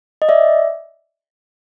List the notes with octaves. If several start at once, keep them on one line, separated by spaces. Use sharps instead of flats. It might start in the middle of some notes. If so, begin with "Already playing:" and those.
D#5
D5 E5